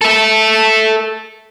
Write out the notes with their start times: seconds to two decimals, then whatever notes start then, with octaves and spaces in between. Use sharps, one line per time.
0.01 A4 E5